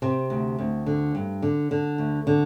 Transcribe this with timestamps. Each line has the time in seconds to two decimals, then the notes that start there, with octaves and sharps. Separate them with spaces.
0.02 C3 C4
0.30 D2
0.59 D2
0.86 D3
1.15 G2
1.42 D3
1.71 D3
1.98 D2
2.27 D3